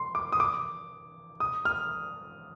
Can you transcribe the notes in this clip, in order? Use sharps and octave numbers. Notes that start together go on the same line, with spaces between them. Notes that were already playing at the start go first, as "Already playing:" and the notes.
Already playing: C6
D6
D#6
D6
D#6
F6